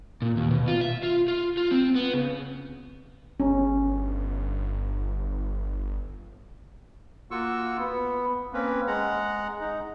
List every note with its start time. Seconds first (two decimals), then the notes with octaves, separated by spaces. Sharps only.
0.22 A#2
0.37 D#2
0.51 B2
0.67 F4
0.81 E5
1.03 F4
1.28 F4
1.57 F4
1.71 C4
1.95 B3
2.13 C#3
3.40 G1 C#4
7.31 A#3 F4 F#4 C#6 E6
7.79 B3
8.53 A#3 C4 C#4 B4
8.87 G#3 F#5 A#5
9.61 D#4